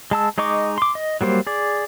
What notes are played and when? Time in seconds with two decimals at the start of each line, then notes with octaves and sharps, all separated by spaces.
0.11 G#3 A5 E6
0.38 G#3 D#4 D#5 C#6 D6
0.78 C6 D6
0.95 D#5
1.21 F#3 G3 A#3 C5
1.47 G#4 D5